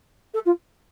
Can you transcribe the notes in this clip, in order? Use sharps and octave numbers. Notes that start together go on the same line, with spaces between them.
A4
F4